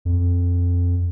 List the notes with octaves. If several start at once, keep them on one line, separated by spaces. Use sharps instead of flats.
F2